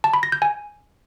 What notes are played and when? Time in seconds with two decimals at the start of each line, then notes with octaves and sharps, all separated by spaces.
0.04 A5
0.14 B5
0.23 A#6
0.32 G6
0.42 G#5